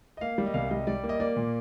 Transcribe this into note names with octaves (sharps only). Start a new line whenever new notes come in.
D#5
A#3 F5
G3
D#5
C2 F5
G3 D#5
G3 D5
A#3
D#5
A#3 D5
A#2